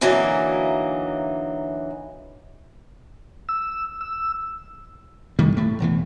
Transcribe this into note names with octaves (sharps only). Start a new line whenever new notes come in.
D3 E3 F#3 A#3 D#4
E6
E6
D#3 G3 A3
A2 A3
E1 E2 E3